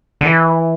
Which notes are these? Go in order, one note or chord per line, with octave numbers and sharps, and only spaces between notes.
D3
E3